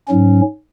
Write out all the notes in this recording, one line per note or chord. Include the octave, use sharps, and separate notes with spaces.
G#2 F#3 C#4